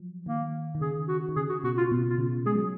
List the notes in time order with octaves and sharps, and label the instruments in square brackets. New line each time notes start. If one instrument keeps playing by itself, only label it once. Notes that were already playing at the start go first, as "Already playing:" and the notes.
Already playing: [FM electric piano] F3 F#3
[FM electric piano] D#3 [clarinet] A#3
[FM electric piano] D#3
[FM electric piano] C#3 [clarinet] G#4
[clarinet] F#4
[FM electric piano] D#3
[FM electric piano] C#3 [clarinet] G#4
[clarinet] F#4
[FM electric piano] B2 [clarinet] F#4
[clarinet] F4
[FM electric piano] B2
[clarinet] F4
[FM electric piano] C#3
[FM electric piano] G#3 [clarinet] G#4
[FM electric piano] F#3